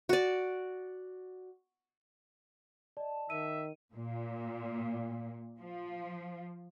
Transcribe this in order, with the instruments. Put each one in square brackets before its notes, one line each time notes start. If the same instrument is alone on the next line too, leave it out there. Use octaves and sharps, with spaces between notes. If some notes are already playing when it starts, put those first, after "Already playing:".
[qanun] F#4 D5
[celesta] D5 D#5 [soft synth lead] A5
[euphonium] D#3 [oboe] E5 [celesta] D#7
[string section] A#2
F3